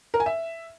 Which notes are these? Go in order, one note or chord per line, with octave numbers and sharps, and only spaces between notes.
A#4
G#5
E5